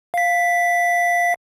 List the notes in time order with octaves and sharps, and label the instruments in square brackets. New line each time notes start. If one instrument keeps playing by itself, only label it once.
[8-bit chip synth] F5 B6